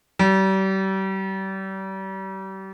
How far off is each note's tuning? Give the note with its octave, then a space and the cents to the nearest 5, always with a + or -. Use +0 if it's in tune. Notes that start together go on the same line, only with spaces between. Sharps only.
G3 -35